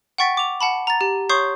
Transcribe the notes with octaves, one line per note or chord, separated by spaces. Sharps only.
F#5 G5 C#6 A6 B6 D7
D6 F7
F#5 A5 B5
A#5 A6
G4
C#5 C6 C#6 D#6 G6 C7